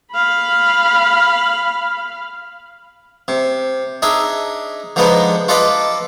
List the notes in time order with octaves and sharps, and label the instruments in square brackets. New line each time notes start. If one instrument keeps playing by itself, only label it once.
[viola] F5 B5
[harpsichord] C3
D4 D#4 G#4 E5
D3 F3 G#3 B3 D4 D#4
F4 A4 B4 D5 D#5